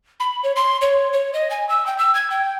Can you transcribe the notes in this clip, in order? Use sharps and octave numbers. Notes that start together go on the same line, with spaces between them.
B5
C#5
C6
C#5
C#5
D#5
G#5
E6
G5
E6
G#6
G5